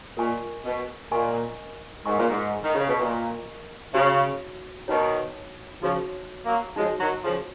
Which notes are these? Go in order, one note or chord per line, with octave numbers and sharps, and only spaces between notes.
A#2 A#4 D#5 G#5 C#6
B2
A#2 A#4 D#5 G#5 C#6
G#2 A#4 D#5 G#5 C#6
A#2
G#2
D#3
C#3
B2
A#2 A#4 D#5 G#5 C#6
C#3 D#4 F#4 C#5
B2 D#3 D#4 F#4 C#5
C#3 F3 D#4 F#4 C#5
F#3 A#3
F3 G#3 D#4 F#4 C#5
D#3 F#3
C#3 F3